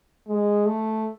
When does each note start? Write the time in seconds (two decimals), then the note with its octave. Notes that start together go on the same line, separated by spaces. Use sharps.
0.27 G#3
0.66 A3